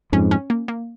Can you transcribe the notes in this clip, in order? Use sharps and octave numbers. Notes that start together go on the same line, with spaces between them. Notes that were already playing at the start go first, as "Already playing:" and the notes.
F2 G#2 C#4
C#4
A#3
A#3